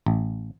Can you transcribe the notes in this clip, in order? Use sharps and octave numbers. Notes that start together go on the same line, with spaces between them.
A1